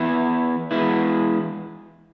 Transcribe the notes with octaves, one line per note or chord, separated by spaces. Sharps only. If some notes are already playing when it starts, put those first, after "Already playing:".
Already playing: E3 B3 E4 B4
E3 G#3 B3 E4 B4